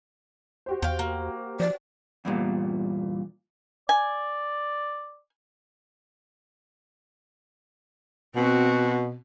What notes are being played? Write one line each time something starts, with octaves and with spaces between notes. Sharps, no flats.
F#4 G4 C5
E2 F5 G5
A#3
F3 D5
E2 G2 A#2
D5 G#5
B2 C4 F#4